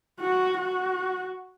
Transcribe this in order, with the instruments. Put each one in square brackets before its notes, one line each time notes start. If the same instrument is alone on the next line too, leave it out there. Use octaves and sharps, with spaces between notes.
[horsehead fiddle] F#4
F#4